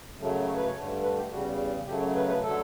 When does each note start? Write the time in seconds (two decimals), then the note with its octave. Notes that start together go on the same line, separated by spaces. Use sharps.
0.17 F#2 C#3 F#3 A3
0.46 C#5
0.56 B4
0.65 C#5
0.74 G2 D3 A3
1.02 B4
1.17 G4
1.30 E2 C#3 G3 F#4
1.87 F#2 C#3 F#3 A3 G4
2.01 C#5
2.15 B4
2.28 B4
2.43 D3 F#3 A3 A4